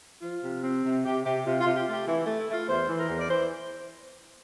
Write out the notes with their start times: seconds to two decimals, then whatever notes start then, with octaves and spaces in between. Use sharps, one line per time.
0.22 F3 F4
0.43 C3
0.63 C4
0.84 C3
1.04 C3 G4
1.24 C3 G4
1.45 C3 F4
1.60 F4
1.66 C3
1.75 G4
1.87 A3 G4
2.06 E3 E4
2.27 A3
2.38 E4
2.48 A3 F4
2.68 E2 C5
2.88 E3
2.99 A#4
3.09 E2
3.19 D5
3.29 E3 C5